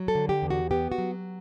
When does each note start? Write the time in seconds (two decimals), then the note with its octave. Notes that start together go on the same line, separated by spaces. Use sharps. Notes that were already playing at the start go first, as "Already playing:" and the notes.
Already playing: F#3
0.08 A4
0.15 D3
0.29 G4
0.42 E2
0.50 F#4
0.71 B3 G4
0.92 F#4
0.98 F#3